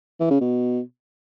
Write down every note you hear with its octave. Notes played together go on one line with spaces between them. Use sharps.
E3
C#3
B2